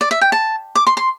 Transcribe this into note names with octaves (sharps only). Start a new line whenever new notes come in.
D5
E5
G5
A5
D6
C6
C6